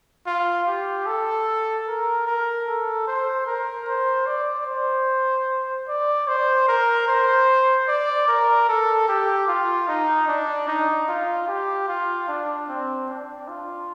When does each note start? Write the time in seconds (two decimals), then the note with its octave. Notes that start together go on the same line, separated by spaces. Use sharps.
0.27 F4
0.68 G4
1.07 A4
1.88 A#4
2.27 A#4
2.68 A4
3.08 C5
3.47 A#4
3.88 C5
4.27 D5
4.67 C5
5.88 D5
6.28 C5
6.68 A#4
7.08 C5
7.88 D5
8.28 A#4
8.69 A4
9.08 G4
9.48 F4
9.88 D#4
10.28 D4
10.68 D#4
11.08 F4
11.48 G4
11.88 F4
12.28 D4
12.69 C4
13.09 D4
13.48 F4